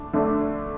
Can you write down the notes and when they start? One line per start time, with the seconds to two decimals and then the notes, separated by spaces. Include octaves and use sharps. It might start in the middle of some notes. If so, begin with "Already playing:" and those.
Already playing: D3 A3 D4
0.13 D3 A3 D4